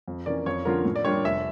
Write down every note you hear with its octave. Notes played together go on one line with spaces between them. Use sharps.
F2
E3 A#3 C#4 D5
F2 C#5
D3 F3 C#4 F4 A#4
A2
D5
G3 A#3 D4 F4 C#5
F1 E5